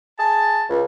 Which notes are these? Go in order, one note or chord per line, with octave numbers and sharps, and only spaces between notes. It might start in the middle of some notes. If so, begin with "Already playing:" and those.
G#4 A5
C#2